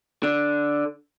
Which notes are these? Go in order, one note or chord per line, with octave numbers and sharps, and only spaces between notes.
D3